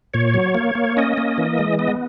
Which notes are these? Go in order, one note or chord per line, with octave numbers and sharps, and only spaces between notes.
A#2 C#5
F#3
A#3
A#3
C#4 D#5
A#3
E3
G#3
B3 D#5